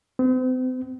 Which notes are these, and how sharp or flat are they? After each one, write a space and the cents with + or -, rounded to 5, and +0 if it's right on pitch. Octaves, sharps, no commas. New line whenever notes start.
C4 -40